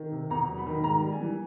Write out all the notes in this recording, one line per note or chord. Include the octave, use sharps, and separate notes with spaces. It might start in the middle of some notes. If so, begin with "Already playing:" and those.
Already playing: D#3
C3
E2 A#5
F#3
B5
D#3
G#2 A#5
G3
G#5
E3